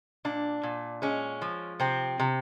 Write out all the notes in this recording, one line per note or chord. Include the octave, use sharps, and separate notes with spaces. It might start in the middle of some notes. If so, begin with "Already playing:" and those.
A#2 D4
A#2
G#3 C#4
F3
C3 C4
C3